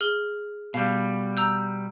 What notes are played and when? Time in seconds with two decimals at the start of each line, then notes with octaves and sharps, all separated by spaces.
0.01 G#4 F6 G7
0.74 B2 G3 F5
1.37 A#5 E6 G6